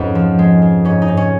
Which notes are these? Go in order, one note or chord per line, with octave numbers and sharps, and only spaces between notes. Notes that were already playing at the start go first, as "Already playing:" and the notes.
Already playing: F2 G#2 B3 C#4
F3
G#3
G#3
G#2 C#4
D#4
G#2
C#4